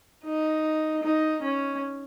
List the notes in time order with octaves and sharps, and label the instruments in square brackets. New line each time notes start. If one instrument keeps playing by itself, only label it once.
[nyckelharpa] D#4
D#4
C#4